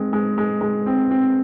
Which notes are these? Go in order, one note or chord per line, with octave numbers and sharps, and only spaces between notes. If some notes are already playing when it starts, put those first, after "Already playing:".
Already playing: G#3 C4
G#3
G#3
G#3
C4
C4